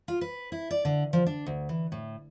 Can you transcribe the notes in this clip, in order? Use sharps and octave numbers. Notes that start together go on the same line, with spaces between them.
F4
B4
E4
D5
D3
F3
D4
D2
E3
A2